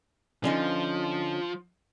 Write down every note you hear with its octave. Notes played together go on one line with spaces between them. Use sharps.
D3 F3 C#4 D#4